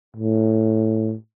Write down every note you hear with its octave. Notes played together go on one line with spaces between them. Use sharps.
A2